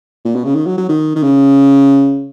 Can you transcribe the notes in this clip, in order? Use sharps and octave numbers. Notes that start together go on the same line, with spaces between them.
A#2
B2
C#3
D#3
F#3
F#3
D#3
D#3
C#3